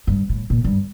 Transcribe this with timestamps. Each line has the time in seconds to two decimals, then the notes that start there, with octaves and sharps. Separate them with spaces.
0.07 G2
0.29 A2
0.50 A#2
0.64 G2